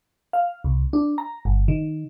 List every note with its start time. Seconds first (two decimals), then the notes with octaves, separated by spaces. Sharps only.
0.33 F5
0.64 C2
0.93 D4
1.18 A#5
1.45 G1
1.68 D#3